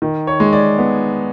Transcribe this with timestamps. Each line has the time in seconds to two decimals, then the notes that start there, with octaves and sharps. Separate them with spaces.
0.02 D#3
0.27 C#5
0.40 G#3
0.53 D5
0.78 B3